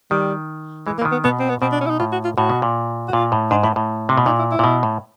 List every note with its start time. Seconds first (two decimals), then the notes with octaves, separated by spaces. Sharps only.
0.11 D#3 G3
0.87 E3 G#3
0.99 A#3
1.01 E3
1.05 D#3
1.12 B3
1.24 B2 B3
1.40 C4
1.50 B3
1.62 B2 C4
1.72 D4
1.81 C#4
1.86 E4
1.90 D#4
1.99 A2 F4
2.12 F#4
2.25 F4
2.37 A2 F#4
2.50 B2
2.62 A#2
3.08 F#4
3.13 A#2 F4
3.32 A2
3.51 G#2 D4
3.63 A2 E4
3.76 A2
4.09 C3
4.17 B2
4.26 A#2 D#4
4.39 E4
4.51 E4
4.59 A#2
4.64 B2
4.83 A2